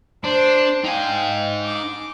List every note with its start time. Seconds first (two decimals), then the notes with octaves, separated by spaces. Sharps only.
0.24 D4 C5
0.84 D#4 F5 G5 G#5
1.66 D6